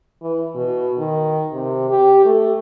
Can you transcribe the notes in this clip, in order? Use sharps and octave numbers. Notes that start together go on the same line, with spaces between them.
E3
B2
D#3
C3
G4
A3